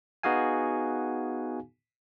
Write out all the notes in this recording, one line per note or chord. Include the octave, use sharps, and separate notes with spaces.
B3 D#4 F#4 G#4 F5 G#5